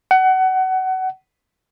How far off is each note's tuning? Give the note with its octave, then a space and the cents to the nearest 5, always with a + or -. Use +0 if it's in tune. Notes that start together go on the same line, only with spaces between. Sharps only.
F#5 +25